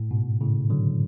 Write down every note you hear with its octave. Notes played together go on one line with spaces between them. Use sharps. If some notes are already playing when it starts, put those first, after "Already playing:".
Already playing: A2
G#2 B2
A2 C#3
D3 F#3